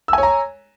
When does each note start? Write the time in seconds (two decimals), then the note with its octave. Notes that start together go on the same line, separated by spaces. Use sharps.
0.08 E6
0.13 G#5
0.18 C#5
0.23 A#5